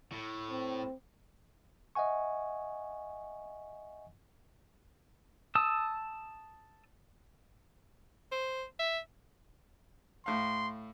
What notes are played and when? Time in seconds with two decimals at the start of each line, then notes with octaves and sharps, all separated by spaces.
0.12 A2
0.51 C4
1.95 D#5 E5 F#5 G#5 C#6
5.55 A5 D#6 E6
8.32 C5
8.79 E5
10.26 A2 F5 C6